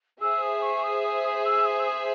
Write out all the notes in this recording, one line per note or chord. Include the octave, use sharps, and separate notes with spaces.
G#4 C5 E5 E6
D#6
C#6
D#6
D#6
D#6
E6
D#6
E6
D#6